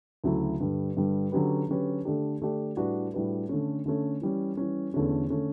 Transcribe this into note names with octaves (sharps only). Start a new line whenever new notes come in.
D2 C#3 F#3 A3 E4
G2 D3 G3
G2 D3 G3
D3 F#3 C#4 G4 B4
D3 F#3 C#4 G4 B4
D3 A3 D4 G4
D3 A3 D4 G4
A2 G3 D4 F#4 B4
A2 G3 D4 F#4 B4
D3 A3 C#4
D3 A3 C#4
E3 G3 C#4
E3 G3 C#4
E2 D3 A3 C#4
D3 A3 C#4